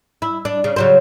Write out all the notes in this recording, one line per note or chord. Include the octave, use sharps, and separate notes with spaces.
E4
D4
C#3
C#3 F#3 C5